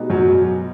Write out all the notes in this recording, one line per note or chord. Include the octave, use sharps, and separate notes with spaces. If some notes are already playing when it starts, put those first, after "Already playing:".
Already playing: B2 G#3 B3 D#4 G4
F#2 F#3